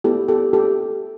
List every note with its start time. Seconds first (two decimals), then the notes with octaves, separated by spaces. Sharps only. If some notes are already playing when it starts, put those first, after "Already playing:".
0.04 B3 E4 G4 A4
0.28 G4 A4
0.53 G4 A4